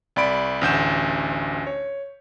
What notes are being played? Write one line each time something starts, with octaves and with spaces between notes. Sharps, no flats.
C2 D5 B5 D7
A1 D2 G6 E7
C#5